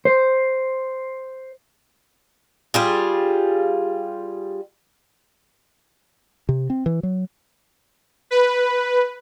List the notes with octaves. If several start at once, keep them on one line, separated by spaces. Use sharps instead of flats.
C5
G3 F4 G#4
C3
C4
E3
F#3
B4